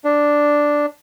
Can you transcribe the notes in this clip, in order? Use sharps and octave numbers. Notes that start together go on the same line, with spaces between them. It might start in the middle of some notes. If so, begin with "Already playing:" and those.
D4